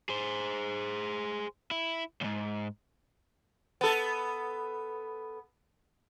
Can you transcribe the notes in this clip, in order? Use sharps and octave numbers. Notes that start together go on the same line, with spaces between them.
G#4 C5
E4
C#2 G#2
B3 A4